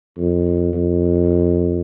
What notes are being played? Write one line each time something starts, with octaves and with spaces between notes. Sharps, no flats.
F2
F2